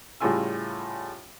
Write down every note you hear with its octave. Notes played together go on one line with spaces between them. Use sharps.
A2 C#3 G3 F4 G#5 E6